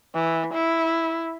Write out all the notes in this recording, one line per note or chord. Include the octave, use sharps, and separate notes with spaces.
E3
E4